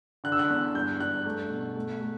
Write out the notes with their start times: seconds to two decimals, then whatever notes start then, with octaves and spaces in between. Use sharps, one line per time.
0.24 D3 F#6
0.32 E6
0.39 F#6
0.50 E2
0.74 G2 G6
1.00 G2 F#6
1.25 A3
1.50 B2
1.76 A3
2.01 A3